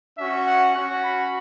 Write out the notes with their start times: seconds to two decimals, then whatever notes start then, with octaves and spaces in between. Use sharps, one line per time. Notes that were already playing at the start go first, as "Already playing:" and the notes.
0.17 C#4 F#4 E5
0.46 F#5
0.75 C#4 F#4
1.04 B5